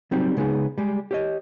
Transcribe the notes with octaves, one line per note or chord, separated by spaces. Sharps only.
F#3 G3 C4 D#4
C#3 G#3 B3 D#4 F#4 G#4
G3 G#3
G4 C#5 D#5